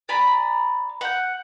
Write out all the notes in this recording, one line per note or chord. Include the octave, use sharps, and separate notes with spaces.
D5 G#5 A#5 B5
F#5 G6